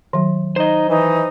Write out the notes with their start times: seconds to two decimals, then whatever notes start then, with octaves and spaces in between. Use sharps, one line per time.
0.13 D#3 F#3
0.56 D#4 C5 D#5
0.90 E3 D#4